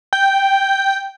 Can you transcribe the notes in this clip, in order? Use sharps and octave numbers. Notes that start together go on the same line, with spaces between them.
G5